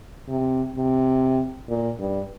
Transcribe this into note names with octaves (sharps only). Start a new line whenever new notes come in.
C3
C3
A#2
G2